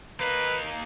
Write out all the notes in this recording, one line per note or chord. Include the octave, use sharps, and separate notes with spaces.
A#3 D#4 B4